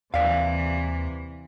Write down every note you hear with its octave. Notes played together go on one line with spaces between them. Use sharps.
D#2 C3 E3 D5 F5